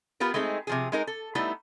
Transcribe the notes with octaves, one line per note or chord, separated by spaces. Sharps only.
B3 F4 G4 A#4
G#3 A3 C4 D#4 G#4
C3 F3 G#4
G#3 D#4 A#4
A4
G3 A3 B3 D#4 E4